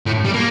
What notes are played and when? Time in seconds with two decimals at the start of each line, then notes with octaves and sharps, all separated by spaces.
0.06 A2
0.25 G3
0.34 A#3